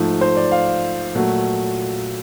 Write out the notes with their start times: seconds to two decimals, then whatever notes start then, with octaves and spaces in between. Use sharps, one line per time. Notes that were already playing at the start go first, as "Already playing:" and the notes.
Already playing: G#2 F3 A3
0.21 C5
0.37 D5
0.52 F5
1.15 A#2 F#3 A3